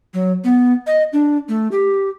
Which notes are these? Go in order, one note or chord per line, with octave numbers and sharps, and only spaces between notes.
F#3
B3
D#5
D4
A3
G4